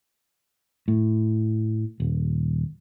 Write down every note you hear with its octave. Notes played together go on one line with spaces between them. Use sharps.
A2
D#1